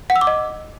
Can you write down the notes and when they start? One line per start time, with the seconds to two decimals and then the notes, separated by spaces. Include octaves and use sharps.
0.10 F#5
0.16 E6
0.21 D6
0.27 D#5